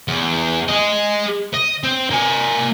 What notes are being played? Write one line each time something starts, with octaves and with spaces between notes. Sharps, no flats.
E2
G#4 D#5
D#5
C4
A#3 G#5